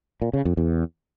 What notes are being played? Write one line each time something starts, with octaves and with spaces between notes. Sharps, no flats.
A#2
C#3
F2
E2